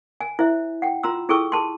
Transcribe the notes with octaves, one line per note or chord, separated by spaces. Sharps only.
G#5
E4 C5 E5
F#5 G5
F4 A#5 C6 E6
E4 G#4 A4 G5 C#6 E6
G#4 A5 C6